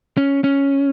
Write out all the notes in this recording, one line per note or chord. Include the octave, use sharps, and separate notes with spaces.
C#4
C#4